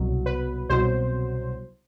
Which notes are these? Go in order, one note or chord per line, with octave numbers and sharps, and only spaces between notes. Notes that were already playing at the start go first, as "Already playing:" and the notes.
Already playing: C2 B2 F#3
B4
C2 B2 F#3 C5